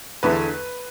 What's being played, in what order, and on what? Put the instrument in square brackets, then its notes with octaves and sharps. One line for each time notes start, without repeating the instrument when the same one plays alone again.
[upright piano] E2 D3 A3 B4